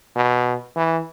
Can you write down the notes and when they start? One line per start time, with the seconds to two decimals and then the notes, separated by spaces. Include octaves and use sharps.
0.16 B2
0.76 E3